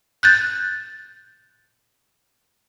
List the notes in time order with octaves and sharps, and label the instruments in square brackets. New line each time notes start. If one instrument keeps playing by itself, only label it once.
[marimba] F#6 G6 A6